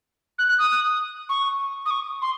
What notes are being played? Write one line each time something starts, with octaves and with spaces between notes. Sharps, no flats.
F#6
F#6
D#6
C#6
D#6
C#6
C6